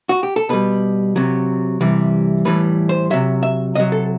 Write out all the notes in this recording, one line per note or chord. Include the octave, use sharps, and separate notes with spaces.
F#4
G4
A4
B2 G3 B4
C3 F#3
C3 E3 G3
A2 E3 G3 B4
C5
C3 F#3 E5
E5
C3 F#3 D#5
A4